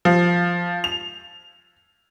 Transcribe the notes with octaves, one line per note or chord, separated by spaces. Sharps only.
F3
F7